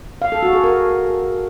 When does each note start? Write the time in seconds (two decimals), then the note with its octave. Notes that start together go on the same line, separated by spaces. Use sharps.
0.22 F5
0.32 A4
0.43 F#4
0.53 G#4
0.64 A#4